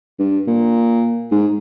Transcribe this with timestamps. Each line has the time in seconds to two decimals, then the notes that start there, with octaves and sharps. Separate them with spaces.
0.19 G2
0.47 A#2
1.32 G#2